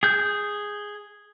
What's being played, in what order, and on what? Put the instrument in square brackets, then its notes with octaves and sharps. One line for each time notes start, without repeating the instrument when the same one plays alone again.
[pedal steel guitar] G#4 G6